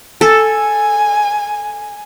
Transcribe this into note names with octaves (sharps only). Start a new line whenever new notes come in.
A4 G#5